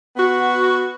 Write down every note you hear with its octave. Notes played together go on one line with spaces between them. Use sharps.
B3 F#4